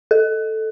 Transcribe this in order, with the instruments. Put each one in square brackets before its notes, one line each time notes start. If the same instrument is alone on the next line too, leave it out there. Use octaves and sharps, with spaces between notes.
[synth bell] A4